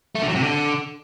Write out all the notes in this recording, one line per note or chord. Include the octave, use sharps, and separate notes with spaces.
A3
D3
F#3
C3
D3